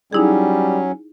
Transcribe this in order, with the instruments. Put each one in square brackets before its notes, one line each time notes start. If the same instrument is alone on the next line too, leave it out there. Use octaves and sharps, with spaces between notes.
[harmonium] F#3 C#4 [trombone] G3 [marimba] D#4 E4 G#4